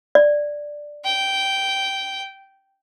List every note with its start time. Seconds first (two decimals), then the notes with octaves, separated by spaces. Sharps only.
0.15 D5
1.05 G5